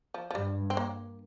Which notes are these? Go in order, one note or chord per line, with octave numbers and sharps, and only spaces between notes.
F3
F3
G2 G3
C4
A#3